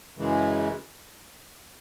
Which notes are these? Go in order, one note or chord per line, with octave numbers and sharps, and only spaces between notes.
F#2 C#3 E3 G#3